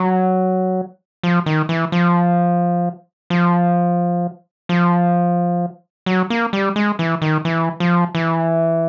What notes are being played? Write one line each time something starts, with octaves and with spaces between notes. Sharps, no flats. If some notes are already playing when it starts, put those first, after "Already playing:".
Already playing: F#3
F3
D#3
E3
F3
F3
F3
F#3
A#3
G3
G#3
E3
D#3
E3
F3
E3